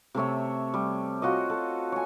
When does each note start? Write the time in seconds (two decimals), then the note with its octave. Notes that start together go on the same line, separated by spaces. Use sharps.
0.15 C3 A3 C#5 E5
0.74 G3
1.22 F4 F#4 C#5 D#5
1.50 A4
1.92 C#5 G#5